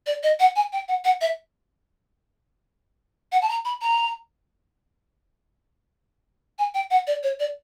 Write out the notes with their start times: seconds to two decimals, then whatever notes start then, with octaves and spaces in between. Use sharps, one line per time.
0.07 D5
0.23 D#5
0.40 F#5
0.56 G#5
0.73 G5
0.88 F#5
1.04 F#5
1.21 E5
3.32 F#5
3.42 A5
3.49 A#5
3.65 B5
3.82 A#5
6.59 G#5
6.74 G5
6.91 F#5
7.07 D5
7.23 C#5
7.40 D5